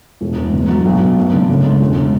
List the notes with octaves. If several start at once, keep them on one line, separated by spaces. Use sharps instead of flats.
E1
E2
D3
F#3
B1
B2
F#2
D3
C#3
G#3
E1